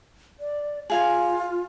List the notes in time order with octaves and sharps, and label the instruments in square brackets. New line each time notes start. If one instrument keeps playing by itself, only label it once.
[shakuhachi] D5
[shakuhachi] F4 [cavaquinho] G#4 F5 G#5